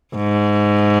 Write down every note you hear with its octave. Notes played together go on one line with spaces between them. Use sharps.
G#2